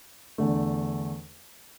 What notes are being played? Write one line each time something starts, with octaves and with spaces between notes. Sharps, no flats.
E2 D3 A3